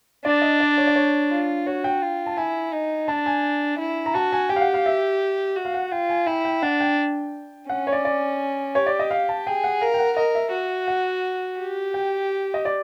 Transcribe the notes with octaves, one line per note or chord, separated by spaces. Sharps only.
D4 D5
D#5
D5
C#5
D5
C#5
F4
F#4 C#5
G5
F4
A5
E4 G#5
D#4
D4 A5
G#5
E4
A#5
F#4 A5
G#5
G4 G5
F5
F#5
F5
E5
F#4
F5
F#5
F4 G5
G#5
E4 G5
G5
D4 F#5
G5
C#4 F#5
C#5
D5
D5
G4 C#5
D5
D#5
F5
A5
G#4 G5
F#5
A#4 F5
G5
F#5
A#4 D#5
E5
F#4
F#5
G4
G5
D#5
D5